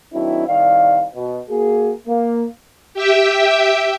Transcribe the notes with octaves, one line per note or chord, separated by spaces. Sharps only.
D#3 F#3 C4 D4 E4
C2 D#3 D5 F5
B2
A#3 F#4 G#4
A#3
G4 E5 G5